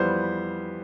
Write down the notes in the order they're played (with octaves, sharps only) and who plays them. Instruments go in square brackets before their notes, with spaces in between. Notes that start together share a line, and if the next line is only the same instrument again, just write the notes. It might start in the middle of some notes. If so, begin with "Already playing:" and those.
Already playing: [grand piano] F2 E3 G3 B3 C5